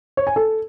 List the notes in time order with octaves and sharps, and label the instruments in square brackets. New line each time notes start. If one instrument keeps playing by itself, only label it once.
[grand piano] C#5
G#5
A4